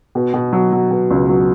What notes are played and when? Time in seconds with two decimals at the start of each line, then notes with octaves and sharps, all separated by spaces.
0.15 B2
0.34 B2
0.53 F#3
0.73 F#3
0.91 B2
1.10 C#2
1.29 F#3